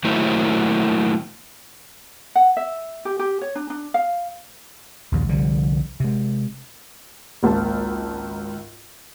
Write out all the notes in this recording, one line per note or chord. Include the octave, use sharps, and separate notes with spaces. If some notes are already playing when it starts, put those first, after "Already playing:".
D#3 F#3 A3 A#3 E4 C5
F#5
E5
G4
G4
C#5
D4
D4
F5
A#1 D#2
C2 D3 F3 G3
C3 G#3
G#1 C#2 A#3 A5